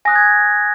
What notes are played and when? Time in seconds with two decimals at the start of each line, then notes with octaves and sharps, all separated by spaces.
0.05 G#5 D#6 F#6 A#6
0.15 G#6